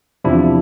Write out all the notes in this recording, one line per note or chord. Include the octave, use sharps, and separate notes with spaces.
E2 C3 F3 D4 E4